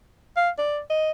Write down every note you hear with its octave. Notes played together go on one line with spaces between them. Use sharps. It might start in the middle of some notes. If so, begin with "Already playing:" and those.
F5
D5
D#5